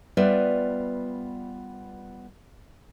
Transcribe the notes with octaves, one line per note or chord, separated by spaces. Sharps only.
G3 B3 F4 B4 D5 E5